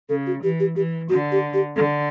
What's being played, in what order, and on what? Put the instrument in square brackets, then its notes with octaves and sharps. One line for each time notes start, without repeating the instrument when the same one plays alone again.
[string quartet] C#3 [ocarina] A4
[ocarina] F#4
[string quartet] E3 [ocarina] G4
[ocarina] G4
[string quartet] E3 [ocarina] G4
[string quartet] D3 [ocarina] F#4
[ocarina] G4
G4
[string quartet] D3 [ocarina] A4